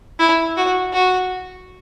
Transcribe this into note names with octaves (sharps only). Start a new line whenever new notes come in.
E4
F#4
F#4